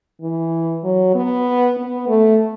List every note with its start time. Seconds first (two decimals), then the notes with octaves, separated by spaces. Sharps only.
0.21 E3
0.84 F#3
1.15 B3
1.77 B3
2.08 A3